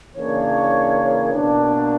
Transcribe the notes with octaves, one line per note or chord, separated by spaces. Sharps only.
C#3 E3 A#3 D4 C#5
B2 A#3 D4